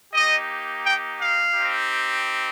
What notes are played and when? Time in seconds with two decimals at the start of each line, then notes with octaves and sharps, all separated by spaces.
0.13 A#3 D#4 G4 D#5
0.83 G5
1.18 F5
1.53 C4 D#4 G4